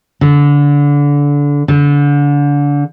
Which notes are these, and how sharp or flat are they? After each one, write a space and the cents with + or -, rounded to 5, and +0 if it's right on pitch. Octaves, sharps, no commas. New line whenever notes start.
D3 -25
D3 -30